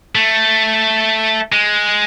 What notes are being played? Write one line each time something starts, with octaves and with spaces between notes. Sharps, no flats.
A3
G#3